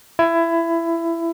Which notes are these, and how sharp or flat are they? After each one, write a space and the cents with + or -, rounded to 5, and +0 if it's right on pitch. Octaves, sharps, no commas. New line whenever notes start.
E4 +20